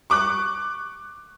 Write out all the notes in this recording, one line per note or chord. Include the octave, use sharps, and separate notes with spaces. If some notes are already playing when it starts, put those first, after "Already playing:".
C#6 D6 F#6